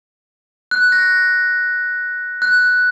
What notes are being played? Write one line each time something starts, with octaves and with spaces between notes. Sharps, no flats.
F#6
A#6
F#6